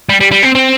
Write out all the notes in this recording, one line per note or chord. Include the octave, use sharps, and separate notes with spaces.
G3
G3
G3
C4
C4